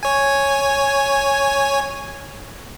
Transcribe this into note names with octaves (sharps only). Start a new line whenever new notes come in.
C#5 G#5